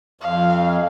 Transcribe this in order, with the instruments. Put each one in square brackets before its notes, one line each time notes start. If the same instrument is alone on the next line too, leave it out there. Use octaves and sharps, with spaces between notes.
[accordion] F2 [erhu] F5